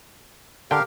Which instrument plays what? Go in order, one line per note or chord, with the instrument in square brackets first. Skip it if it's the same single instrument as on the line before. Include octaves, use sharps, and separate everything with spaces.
[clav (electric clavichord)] D3 G5 [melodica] G4 A#4 F5